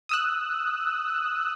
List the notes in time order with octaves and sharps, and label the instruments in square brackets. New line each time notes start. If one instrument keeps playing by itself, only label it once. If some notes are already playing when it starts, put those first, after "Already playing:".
[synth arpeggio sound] D#6 E6 F#6